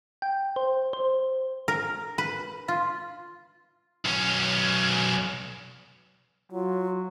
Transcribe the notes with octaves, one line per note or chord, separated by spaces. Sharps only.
G5
C5
C5
A#4
B4
F4
B1 C#4
F#3 F4